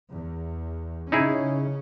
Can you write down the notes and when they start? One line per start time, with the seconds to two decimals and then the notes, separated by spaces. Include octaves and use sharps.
0.12 E2
1.12 C#3 C#4 D#4 E4 G#4